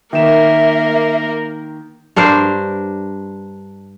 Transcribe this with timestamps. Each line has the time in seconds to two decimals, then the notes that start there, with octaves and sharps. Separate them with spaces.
0.13 D#3 A#3 A#4 E5 E7
2.16 G2 D4 A#4 C5